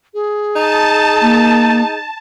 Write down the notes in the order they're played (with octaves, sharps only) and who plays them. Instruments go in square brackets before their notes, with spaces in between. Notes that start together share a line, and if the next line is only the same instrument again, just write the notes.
[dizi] G#4
[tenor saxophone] D#4 [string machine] A5
[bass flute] A#3